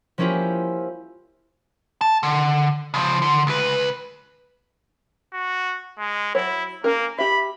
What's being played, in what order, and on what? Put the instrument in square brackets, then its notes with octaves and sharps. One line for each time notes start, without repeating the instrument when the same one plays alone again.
[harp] F3 A#3 C#4 E4 F4 G4
[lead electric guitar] A5
D3
C#3 F3
D3
C#2 B4
[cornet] F#4
G#3
[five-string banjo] F#3 C#5 [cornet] E4
[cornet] A#3 [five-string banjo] C#4 A#4
[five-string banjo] G4 E5 [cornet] B5